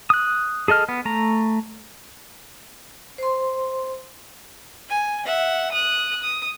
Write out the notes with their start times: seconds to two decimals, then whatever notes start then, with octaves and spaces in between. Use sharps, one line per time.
0.10 D#6 F#6
0.68 G#4 A4 D#5 F6
0.89 B3
1.05 A3 A#5
3.18 C5 C6
4.89 G#5
5.26 E5 F#5
5.72 D#6 F#6
6.22 D#6